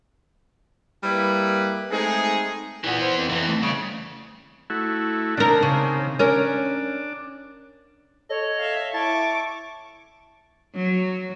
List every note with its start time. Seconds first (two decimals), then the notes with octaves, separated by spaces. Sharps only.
1.04 G3 A#3 E4 B4
1.91 G#3 A3 C4 D#4 G#4
2.84 A#2 E3 B3
3.01 C5
3.17 F2
3.30 E2 E3
3.47 A3
3.63 C#3 G3
4.70 A3 E4 F#4
5.37 C3 D#3 D4 A#4
5.63 C#3
6.19 C#4 D4 A#4
8.30 A4 C#5 D#5
8.59 E5 F5
8.94 E4 A5 C#6 D6
10.75 F#3